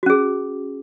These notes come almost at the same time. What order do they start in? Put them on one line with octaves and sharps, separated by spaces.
F#4 C#4 G#4